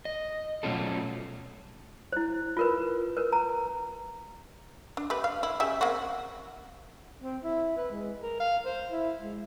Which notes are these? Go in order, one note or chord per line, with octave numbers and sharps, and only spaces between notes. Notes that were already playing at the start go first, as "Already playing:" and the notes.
D#5
B2 F#3 A3 C#4 F4 A4
E4 C5
F4 A#4 B4
A#4 B4
A#5
D4
A3 G4 B4
F5
E4
C#3 G4 E5
A#3 C4 F#4
C4
E4
B4
G#3
A#4
F5
C5
E4
G#3